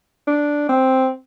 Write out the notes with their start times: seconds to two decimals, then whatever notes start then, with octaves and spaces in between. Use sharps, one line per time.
0.27 D4
0.69 C4